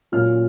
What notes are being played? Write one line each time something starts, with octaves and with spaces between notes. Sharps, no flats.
A#2 F#3 C#4 F4 F6